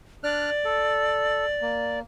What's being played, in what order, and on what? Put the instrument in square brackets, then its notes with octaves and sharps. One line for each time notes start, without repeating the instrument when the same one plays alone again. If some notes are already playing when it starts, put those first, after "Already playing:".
[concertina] D4 F6 F#6 [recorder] D5
[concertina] A4
A#3